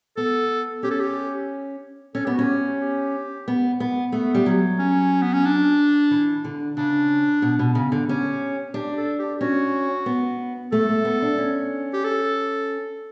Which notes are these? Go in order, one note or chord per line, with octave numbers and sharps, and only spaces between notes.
B3 A4
C#4 G4
A4
G4
C#4 A4
B3 G4
C#4 F#4
G4
G4
B3
B3
A3 B3
G3
F#3
C#4
B3
C#4
D4
E3
D3
C#3 D4
B2
B2
C#3
D3
C#4 G4
D4 G4
A4
G4
C#4 F#4
B3
A3 A4
A3
B3
D4
C#4
G4
A4